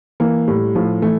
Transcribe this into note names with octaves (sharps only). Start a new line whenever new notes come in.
E3 A#3
A2 G3
A2 F3
E3 A3